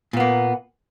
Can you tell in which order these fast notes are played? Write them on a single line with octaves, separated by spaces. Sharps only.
A#2 B3 A#3